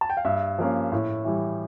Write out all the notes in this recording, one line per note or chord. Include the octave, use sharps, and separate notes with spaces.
A5
G5
F5
G2 E5
F3 A#3 C#4
A2
E3 G3